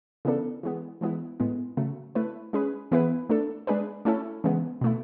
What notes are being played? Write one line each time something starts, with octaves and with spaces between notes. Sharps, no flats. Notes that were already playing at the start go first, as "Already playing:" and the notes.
C#3 E3 B3 D4 A4
E3 G#3 B3
E3 G#3 B3 E4
A2 G#3 B3
C#3 F#3 A3
A3 E4 B4
G#3 C#4 G#4 B4
E3 B3 E4 G#4 B4
A3 D4 A4
G#3 D4 G#4 B4
A3 C#4 E4 A4
C#3 E3 G#3 B3
B2 A3 E4